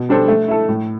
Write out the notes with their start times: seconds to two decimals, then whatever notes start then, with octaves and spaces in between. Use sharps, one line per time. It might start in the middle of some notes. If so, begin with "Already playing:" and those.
Already playing: B2
0.09 G3 D4 A4 C5
0.28 A3
0.48 E4 A4
0.69 A2